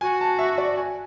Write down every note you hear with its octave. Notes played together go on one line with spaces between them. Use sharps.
F#4 G#5
A5
E5
D5
G#5